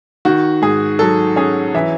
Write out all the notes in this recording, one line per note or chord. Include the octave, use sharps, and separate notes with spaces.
D#3 F#4
G#2 G#4
F#3 A4
C#4 G#4
E3 E5